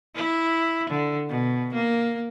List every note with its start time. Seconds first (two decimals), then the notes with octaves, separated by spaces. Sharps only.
0.15 E4
0.90 D3
1.29 B2
1.74 A#3